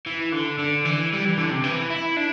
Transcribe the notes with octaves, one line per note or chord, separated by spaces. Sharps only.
E3
D3
D3
E3
G3
E3
D3
C3
E3
E4
D4